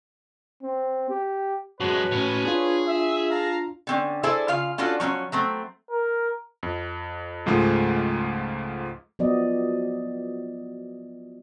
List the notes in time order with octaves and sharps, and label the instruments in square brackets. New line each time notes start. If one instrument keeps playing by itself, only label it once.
[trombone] C4
G4
[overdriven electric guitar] F#2 G#3 [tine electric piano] F#4 A5 [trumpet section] B4 C#5
[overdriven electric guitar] A2 C#4
[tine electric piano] D4 F4 [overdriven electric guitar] G#4
[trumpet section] E5
F5 A5 A#5
[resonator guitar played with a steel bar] D3 C4 C#4
E4 G#4 A4 C5 D5 E5
C#3 F4 F5
C#4 D4 F4 F#4 A4
F3 F#3 C4 C#4
F#3 A3 C4
[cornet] A#4
[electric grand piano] F2
C#2 G#2 F3 G#3 A3
[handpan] F3 F#3 B3 F#4 D5 D#5